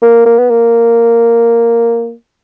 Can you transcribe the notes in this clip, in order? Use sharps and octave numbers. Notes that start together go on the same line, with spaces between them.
A#3
A#3
B3
A#3